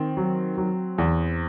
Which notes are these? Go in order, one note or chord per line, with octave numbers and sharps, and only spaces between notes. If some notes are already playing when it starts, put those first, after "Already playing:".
Already playing: D#3 C4
F#3
F#3
E2